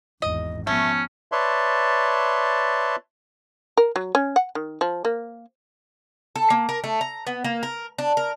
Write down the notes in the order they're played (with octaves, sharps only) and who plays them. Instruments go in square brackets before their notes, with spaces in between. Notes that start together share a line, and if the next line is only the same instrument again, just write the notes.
[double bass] G#1 E2 [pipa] D#5
[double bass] F3 B3 [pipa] A3 [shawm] C#4
[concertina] B4 C#5 D5 E5 A5 C6
[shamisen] A#4
F#3
C#4
F#5
D#3
F3
A#3
[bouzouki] A4
A#3
A#4
A3
A#5
B3
A#3
A#4
D4
A#4